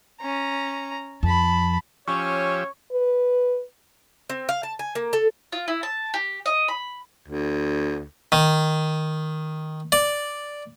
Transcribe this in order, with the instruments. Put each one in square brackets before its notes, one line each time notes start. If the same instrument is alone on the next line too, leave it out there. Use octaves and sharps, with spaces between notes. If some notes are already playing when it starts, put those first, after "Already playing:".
[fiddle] C#4 A#5
[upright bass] F2 [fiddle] A5 B5
[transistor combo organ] F3 G4 E6 [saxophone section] C#4 [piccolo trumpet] C#5 [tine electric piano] C#6
[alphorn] B4
[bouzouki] C4
F5
A5
G#5
A#3
A4
[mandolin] F4
E4
A5
G4
D#5
B5
[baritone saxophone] D2
[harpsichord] D#3
D5